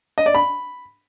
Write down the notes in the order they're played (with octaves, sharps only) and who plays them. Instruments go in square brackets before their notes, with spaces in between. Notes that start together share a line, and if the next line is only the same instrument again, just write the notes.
[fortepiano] D#5
D5
B5